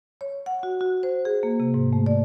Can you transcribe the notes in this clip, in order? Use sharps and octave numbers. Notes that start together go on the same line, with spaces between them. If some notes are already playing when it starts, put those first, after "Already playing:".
C#5
F#5
F#4
F#4
C5
G#4
A#3
C3
G#2
A3
D5